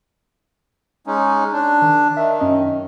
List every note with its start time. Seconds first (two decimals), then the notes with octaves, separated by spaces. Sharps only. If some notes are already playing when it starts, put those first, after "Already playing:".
1.07 G#3 C#4 D#4
1.52 D4
1.82 D#3
2.17 D#3 E5
2.40 F#2 C#4 D#5